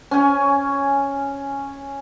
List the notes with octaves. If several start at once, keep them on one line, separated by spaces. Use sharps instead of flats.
C#4 G#5